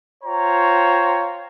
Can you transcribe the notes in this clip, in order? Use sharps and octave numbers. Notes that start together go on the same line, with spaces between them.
F4 C5 C#5 G5 A#5